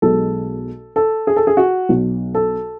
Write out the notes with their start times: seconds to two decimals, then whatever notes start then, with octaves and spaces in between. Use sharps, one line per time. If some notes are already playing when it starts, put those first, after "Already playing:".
0.02 B1 B2 G#3 A4
0.96 A4
1.27 G#4
1.36 A4
1.47 G#4
1.57 F#4
1.89 B1 B2 F#3
2.35 A4